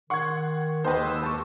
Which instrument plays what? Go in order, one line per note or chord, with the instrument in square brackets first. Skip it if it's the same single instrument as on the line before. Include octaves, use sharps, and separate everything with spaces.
[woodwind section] D#3 [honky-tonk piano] F#5 C6 [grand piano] C#6 G#6
[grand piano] D#2 G5 [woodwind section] F#4 G#4 D#5 [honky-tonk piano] B4 C5
[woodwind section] G#3 D#6 E6
[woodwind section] G4 [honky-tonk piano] A5 C#6